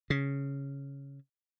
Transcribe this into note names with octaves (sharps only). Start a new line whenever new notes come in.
C#3